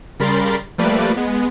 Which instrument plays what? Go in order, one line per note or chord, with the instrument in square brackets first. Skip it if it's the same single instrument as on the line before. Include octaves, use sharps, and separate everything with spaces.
[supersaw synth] C#3 G3 A#4 B5 C6 A6
F3 G3 A3 A#3 B4 D5
G#3 B3